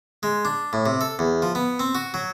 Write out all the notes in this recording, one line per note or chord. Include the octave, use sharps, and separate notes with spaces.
G#3
D4
A2
C3
A4
E2
F3
B3
C4
F#4
F#3